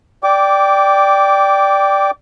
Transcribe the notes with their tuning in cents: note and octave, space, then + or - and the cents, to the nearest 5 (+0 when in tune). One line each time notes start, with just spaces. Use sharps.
D5 +0 G5 +0 D6 -15